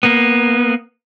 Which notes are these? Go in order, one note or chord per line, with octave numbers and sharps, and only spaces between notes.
A#3 B3